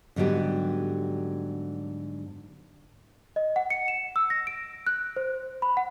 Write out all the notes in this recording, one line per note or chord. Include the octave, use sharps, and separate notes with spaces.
G#2 D3 F#3 G3 B3 G4
D#5
F#5
C#7
E7
E6
A#6
D7
F#6
C5
B5
F#5